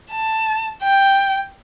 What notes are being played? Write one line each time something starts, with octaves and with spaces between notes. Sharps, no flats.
A5
G5